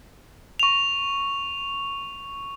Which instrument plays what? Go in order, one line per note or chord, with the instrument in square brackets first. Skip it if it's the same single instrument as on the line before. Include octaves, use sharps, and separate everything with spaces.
[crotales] C#6 F7